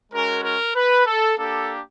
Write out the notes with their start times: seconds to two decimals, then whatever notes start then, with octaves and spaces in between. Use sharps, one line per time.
0.12 G#3 C#4 F#4 A#4
0.44 A#4
0.75 B4
1.06 A4
1.38 A#3 D4 G4 A4